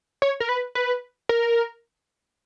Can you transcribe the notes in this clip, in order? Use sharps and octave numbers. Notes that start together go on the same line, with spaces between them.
C#5
A#4
B4
B4
A#4